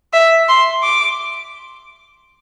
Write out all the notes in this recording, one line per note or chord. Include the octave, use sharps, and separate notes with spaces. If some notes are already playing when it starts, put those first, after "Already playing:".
E5
C6
D6